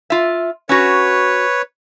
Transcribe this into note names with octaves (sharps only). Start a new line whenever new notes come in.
F4 E5
C#4 F#4 B4 C#5